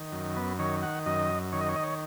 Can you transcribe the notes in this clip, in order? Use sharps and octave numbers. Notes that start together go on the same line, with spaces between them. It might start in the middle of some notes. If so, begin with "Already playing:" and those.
Already playing: D#3
F#2
B3
D#3 C#5
F#5
F#2 D#5
D#3 C#5
D#5
C#5
D#5
C#5